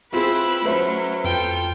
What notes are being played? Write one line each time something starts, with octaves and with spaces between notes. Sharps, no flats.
C4 E4 F4 G#4 B4 B5
F#3 A3 C#4 B4 C5 E5 B5
F2 F4 A4 G5